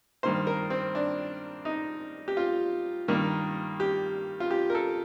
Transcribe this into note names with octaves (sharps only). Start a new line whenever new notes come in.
G2 D#3 A#3 C5
A#4
C4
D4
D#4
G4
F4
G2 D#3 A#3
G4
F4
G4
A#4
A4